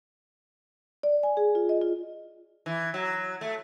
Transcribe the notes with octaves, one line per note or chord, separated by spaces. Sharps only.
D5
G#5
G#4
F4
D#5
F4
E3
F#3
A3